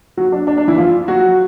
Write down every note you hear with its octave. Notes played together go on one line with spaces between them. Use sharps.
F#3 F#4
D4
D4
D4
E3 E4
F3 F4
F#3 F#4